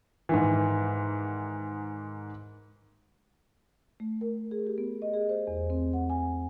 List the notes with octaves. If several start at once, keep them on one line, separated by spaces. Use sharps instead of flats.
G#2 D#3 E3
A3
A#4
G#4
G4
B3
D#5
G#4
C5
E2
C4
F#5
G#5